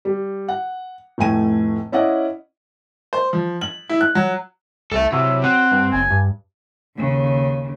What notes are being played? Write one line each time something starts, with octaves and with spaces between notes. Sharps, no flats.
G3
F#5
F1 A2 A3 G#5 D#7
C#4 E4 D5 D#5 F#5
C5
F3
F#7
E4
F#6
F#3
C2 A4 E5
C3 F#3 E4
C4 F#5
G2
F#1 G#5
G2
D#2 C#3